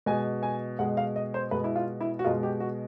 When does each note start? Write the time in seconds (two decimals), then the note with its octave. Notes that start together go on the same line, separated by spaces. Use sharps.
0.06 B2 G#3 G#5
0.43 G#5
0.79 B2 G#3 F#5
0.97 F5
1.16 D#5
1.34 C5
1.51 B2 G#3 B4
1.64 E4
1.76 F4
2.01 E4
2.19 F#4
2.24 B2 G#3 F4
2.43 G4
2.60 F#4